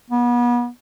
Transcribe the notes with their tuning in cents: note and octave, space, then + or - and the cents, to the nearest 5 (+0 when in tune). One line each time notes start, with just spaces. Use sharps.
B3 -35